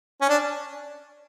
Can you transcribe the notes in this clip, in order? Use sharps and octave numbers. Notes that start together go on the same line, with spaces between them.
C#4
D4